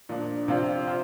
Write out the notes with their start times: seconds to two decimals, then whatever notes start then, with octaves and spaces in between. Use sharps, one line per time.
0.09 A#2 F3 D4
0.48 C3 F3 C4 F4 D5
0.87 F4 C5